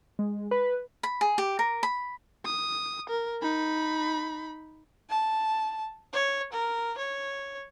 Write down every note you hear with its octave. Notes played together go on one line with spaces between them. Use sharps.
G#3
B4
B5
G#4
G4
A#4
B5
D#6
A#4
D#4 B5
A5
C#5
A#4
C#5